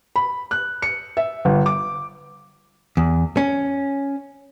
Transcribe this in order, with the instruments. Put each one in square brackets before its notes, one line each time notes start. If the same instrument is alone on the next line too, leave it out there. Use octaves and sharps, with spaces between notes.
[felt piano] B5
F#6
C#7
E5
G1
D6
[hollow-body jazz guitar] E2
C#4